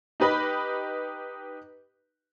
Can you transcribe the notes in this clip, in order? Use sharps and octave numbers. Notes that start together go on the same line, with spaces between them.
D#4 G4 B4 D#5 B5